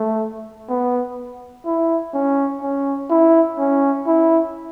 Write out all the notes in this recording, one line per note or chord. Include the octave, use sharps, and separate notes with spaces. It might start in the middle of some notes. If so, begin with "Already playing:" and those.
Already playing: A3
B3
E4
C#4
C#4
E4
C#4
E4